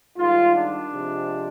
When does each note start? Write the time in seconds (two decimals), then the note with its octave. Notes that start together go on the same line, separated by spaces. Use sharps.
0.18 G#2 D#3 G3 F4
0.55 D4
0.92 C3 F3 G#3 C4